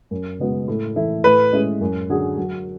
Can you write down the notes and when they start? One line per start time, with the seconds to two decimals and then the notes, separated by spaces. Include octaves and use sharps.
0.11 F#2
0.39 C#3 G#3 B3 F#4
0.68 A2
0.96 E3 A3 E4
1.24 A2 B4
1.52 G#3 C#4 E4 G#4
1.81 F#2
2.09 D3 F#3 C#4 G#4
2.37 F#3